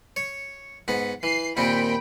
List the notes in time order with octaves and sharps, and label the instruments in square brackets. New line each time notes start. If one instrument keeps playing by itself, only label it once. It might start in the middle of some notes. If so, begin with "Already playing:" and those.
[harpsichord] C#5
G#2 B3
[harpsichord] E3 [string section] C7
[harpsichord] D#2 A#2 C4 [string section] G5 B5